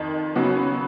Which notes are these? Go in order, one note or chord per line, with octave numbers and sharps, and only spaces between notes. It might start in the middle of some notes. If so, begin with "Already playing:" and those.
Already playing: F2 D#3
C#3 F#3 B3